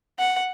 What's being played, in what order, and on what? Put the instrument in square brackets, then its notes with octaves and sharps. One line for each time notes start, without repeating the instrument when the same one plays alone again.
[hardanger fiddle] F#5